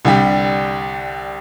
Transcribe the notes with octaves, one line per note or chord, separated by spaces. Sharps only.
C2 D3 G3 G4